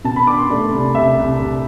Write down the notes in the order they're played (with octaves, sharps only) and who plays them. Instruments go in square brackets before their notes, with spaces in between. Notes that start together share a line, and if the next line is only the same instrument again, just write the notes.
[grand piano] B2 A5
B5
D4 D6
C6
A3 D5
C2
C2 E5
C2
C2